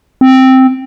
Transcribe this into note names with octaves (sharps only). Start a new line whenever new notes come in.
C4